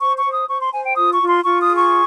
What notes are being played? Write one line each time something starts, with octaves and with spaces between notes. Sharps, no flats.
C5 C#6
C#6
C5
D#6
C5 C#6
C6
C5 G#5
G5
F4 D#6
C#6
F4
C6
F4 C#6
D#6
G#4
C#6